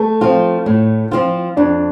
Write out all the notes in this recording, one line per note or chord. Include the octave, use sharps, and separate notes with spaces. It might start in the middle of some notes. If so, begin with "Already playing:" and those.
Already playing: A3
F3 C4 F4
A2
F3 C4 F4
F2 D4